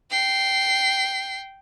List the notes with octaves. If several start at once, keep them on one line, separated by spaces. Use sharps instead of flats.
G5 C7